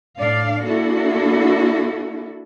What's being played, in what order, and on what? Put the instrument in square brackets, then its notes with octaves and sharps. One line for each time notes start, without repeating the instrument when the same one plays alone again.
[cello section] A2 D4 D5 F5
A#3 D4 E4 F#4 A4